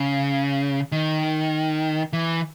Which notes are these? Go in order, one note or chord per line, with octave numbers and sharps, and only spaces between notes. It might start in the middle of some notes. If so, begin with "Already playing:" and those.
Already playing: C#3
D#3
E3